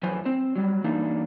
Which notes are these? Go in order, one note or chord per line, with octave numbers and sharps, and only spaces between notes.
F2 E3 F#3 B4 C5 G#5
C4 C5
F#3 G3
E3 A#3 D4 D#4